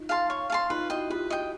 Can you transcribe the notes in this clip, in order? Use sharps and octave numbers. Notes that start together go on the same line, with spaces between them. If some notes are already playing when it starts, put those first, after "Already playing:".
Already playing: D#4 F4
F5 A5 C6
C#5
F5 A5 C6
D#4 F4 B4
E4 F#4 D#5 G5
F4 G4 B4
D#5 G5